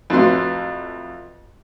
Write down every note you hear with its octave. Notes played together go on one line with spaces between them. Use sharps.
F2 A2 F#3 F#4 B4 C6